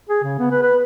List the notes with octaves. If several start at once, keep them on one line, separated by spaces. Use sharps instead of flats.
G#4
C#3
B3
B4
B4